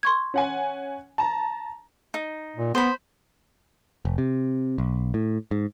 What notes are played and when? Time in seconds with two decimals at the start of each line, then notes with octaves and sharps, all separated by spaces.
0.03 C6 C#6 G#6
0.34 C#4 F#5 G#5
1.18 A5 A#5
2.14 D#4
2.56 A#2
2.75 B3 C5 B5
4.05 F1
4.18 C3
4.78 B1
5.14 A2
5.51 G#2